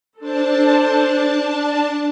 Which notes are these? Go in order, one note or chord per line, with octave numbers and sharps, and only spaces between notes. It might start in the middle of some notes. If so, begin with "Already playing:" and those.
D4 A4 C5 A5